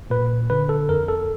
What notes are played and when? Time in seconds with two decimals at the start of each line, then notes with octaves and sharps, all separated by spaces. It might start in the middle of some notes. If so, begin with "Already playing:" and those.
0.10 A#2 B4
0.50 D3 B4
0.69 A4
0.89 F2 A#4
1.08 A4